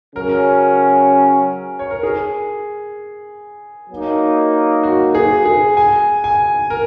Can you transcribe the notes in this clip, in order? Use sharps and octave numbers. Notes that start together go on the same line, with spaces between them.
C#3 F#3 C#4 A#4
C#5
A#4
G#4
F#3 A#3 D#4
F#4
G#4
G#4
G#5
G#5
A#4